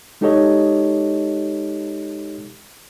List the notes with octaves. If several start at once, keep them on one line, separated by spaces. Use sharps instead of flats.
G#3 D#4 G4 A4 C#5 D#5